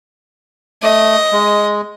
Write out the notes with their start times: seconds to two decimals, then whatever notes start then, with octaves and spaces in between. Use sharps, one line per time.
0.83 A3 D#5
1.32 G#3